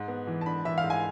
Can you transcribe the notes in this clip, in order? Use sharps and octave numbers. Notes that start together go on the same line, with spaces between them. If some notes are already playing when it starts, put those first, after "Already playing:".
Already playing: G#2
B3
E3
A5
D4 B5
E3 E5
F5
G#2
G#5